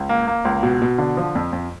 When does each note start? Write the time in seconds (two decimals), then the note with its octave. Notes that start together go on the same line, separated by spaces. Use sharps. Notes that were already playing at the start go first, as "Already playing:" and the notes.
Already playing: C#2
0.09 A#3
0.28 A#3
0.45 C#2
0.63 B2
0.82 B2
0.98 D3
1.17 F3
1.35 F2
1.53 F2